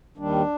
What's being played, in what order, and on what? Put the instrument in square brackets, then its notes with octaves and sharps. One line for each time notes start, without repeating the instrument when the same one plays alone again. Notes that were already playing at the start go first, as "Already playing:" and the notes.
[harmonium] D#2 D#3 G3 D4